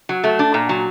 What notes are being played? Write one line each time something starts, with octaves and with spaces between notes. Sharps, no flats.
F#3
A3
D4
A#2
F#3